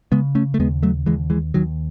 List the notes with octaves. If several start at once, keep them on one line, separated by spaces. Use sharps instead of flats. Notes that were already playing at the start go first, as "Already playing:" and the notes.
C#3 G#3 B3
A3 C#4
A3
D#2 G#3 B3
F#3 A3
D#2 E3 G#3
E3 G#3
D#2 D#3 F#3